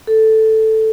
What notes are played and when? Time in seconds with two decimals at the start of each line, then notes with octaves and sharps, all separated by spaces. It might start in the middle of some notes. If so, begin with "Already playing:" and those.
0.07 A4